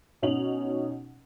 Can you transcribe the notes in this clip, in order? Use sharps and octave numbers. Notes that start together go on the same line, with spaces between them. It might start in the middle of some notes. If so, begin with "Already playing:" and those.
B2 C#4 D#4 F7 F#7